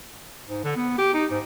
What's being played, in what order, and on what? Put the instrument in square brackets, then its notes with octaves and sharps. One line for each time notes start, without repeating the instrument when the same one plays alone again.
[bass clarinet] G#2
D3
B3
G4
D#4
G#2